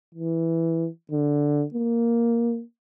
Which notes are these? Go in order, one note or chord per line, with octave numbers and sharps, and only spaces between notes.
E3
D3
A#3